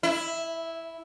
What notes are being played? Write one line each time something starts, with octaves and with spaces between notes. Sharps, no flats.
E4